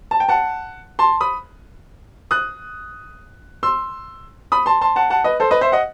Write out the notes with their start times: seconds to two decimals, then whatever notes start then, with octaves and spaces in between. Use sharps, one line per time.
0.11 A5
0.20 G5
0.29 F#5 A5
0.99 A5 C6
1.21 B5 D#6
2.31 D#6 F#6
3.63 C6 E6
4.52 B5 D#6
4.66 A5 C6
4.81 A5 C6
4.96 F#5 A5
5.10 F#5 A5
5.24 B4 D#5
5.40 A4 C5
5.51 B4 D#5
5.61 C5 E5
5.72 D#5 F#5